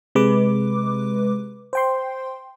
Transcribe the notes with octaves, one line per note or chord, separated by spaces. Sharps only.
C3 G#3 B4 D6
C5 G5 C6